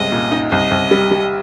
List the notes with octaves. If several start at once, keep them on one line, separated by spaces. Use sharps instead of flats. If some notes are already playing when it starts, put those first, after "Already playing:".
Already playing: C2 G#3 D#5
A#2
D#4
C2 D#5
C2
G3
G3